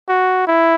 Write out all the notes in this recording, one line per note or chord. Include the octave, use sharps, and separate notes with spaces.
F#4
E4